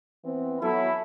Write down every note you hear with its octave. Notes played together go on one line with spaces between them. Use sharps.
E3 B3 C4
F#3 B3 E4 A4 G#5 B5 C#6